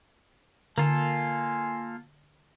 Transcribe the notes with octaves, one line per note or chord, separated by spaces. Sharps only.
D3 A#3 F4 A4 G#5